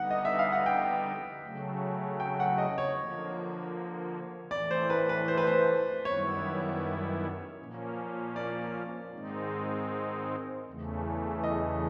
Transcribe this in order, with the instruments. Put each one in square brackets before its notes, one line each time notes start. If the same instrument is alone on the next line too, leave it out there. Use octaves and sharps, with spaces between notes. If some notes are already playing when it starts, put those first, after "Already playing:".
Already playing: [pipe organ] D3 G3 B3 D#4 [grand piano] F#5
[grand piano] D#5
E5
F5
F#5
G5
[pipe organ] C#3 F#3 A3
[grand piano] G5
F#5
D#5
C#5
[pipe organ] D3 F3 A#3
[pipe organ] A2 E3 A3 [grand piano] D5
[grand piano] C5
B4
B4
C5
B4
C5
[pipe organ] F#2 D#3 G3 B3 E4 [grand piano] C#5
[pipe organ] A#2 F3 A#3 C#4
[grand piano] D5
[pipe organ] G#2 D#3 G#3 C4 D#4
E2 C#3 E3 A3
[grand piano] D#5